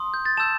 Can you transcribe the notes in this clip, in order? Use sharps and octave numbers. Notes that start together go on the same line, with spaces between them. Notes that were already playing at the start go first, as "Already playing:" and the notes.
Already playing: C6 D#6
G6
A6
A5 E6 G6 E7